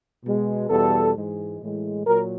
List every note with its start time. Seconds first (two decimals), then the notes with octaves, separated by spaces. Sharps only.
0.25 B2 G#3
0.69 E2 B2 G3 A4
1.15 G#2 E3 G#3
1.62 A2 E3 G#3
2.07 A#2 F#3 A#4